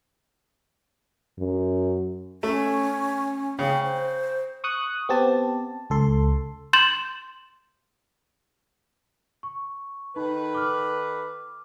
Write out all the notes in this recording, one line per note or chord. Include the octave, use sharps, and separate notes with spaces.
F#2
A3 C#4
C#3 G5
C5
C#6 D#6 F#6
B3 C4 G4 A5
C#2 A4 C6
C6 G6 A6 E7 F#7
C#6
D#3 D#4 A4 B4
D6 F6